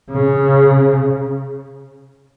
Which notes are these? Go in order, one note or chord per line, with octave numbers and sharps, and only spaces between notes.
C#3